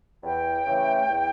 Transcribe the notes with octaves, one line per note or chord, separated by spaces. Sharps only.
E2 G5
C#3 E3 A3
E2